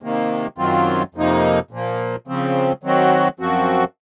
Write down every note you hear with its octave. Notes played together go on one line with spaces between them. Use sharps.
C3 D#3 A#3
F#2 D#3 F#3 C4 F4
F2 C3 F3 A#3 D#4
A#2 F3 A#3
C#3 F3 C4
D#3 F#3 C4 F#4
F#2 F3 C4 F#4